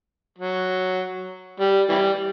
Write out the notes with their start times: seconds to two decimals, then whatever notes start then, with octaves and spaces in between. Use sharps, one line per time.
0.38 F#3
1.60 G3
1.89 E3 G3